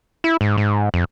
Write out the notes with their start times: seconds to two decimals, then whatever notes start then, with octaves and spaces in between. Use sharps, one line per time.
0.24 E4
0.41 G#2
0.57 G#2
0.94 F2